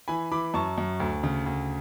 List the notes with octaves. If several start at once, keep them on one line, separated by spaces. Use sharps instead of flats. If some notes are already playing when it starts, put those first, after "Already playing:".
E3 G#5 B5
E3 B5 D6
F#2 A5 C#6
F#2
D2
C#3
D2